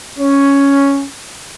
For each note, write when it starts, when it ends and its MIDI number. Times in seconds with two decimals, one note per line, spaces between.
0.19 1.06 61